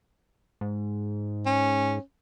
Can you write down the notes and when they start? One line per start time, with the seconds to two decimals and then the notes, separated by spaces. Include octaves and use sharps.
0.61 G#2
1.46 C#4